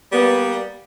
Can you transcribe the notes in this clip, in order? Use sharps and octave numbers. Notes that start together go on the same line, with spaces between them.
G3 A#3 B3